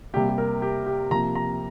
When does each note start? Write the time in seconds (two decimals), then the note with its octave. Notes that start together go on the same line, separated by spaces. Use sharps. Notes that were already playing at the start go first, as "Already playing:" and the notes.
0.14 C3 G3 A#3 G4
0.29 G4
0.38 A#4
0.62 G4
0.86 G4
1.11 C3 F3 A#3 A#5
1.35 A#5